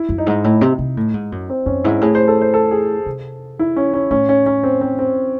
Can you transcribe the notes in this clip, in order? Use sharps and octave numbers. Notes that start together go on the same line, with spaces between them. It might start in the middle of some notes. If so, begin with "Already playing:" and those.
Already playing: E4
F#2
D#4
G#2
A2
C3
C3
A2
G#2
F#2
C4
F#2 C#4
G#2 E4
A2 G#4
C5
A4
C5
A4
G#4
C3
E4
C#4
C#4
A2 C#4
C#4
C#4
C4
C4
C4